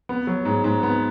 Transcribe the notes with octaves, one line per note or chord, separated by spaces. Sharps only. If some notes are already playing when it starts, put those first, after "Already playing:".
B3
F#3
G#2
G#2
B3